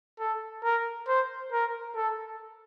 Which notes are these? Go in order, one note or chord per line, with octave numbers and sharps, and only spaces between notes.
A4
A#4
C5
A#4
A4